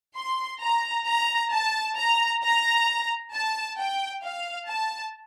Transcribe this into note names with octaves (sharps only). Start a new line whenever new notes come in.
C6
A#5
A#5
A5
A#5
A#5
A5
G5
F5
A5